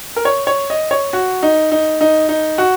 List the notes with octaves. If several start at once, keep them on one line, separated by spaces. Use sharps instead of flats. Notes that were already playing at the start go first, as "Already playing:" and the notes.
A#4
C#5
C#5
D#5
C#5
F#4
D#4
D#4
D#4
D#4
F#4